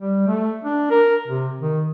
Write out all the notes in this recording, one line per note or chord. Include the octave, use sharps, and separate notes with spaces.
G3
A3
D4
A#4
C3
D#3